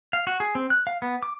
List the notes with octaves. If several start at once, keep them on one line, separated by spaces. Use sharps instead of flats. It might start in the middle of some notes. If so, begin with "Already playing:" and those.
F5
F#4
G#4
C4
F#6
F5
B3
D6